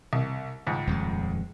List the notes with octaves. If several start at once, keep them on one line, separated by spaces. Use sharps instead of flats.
C2
C#2 G#2
D#1 F2 G#3